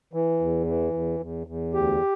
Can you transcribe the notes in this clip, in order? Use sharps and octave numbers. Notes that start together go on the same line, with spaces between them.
E3
E2
E3
E2
E2
E2
D2 G4